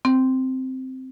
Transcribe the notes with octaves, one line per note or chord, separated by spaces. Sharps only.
C4